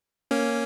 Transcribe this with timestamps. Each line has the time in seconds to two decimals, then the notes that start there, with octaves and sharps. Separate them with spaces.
0.31 A#3 C#4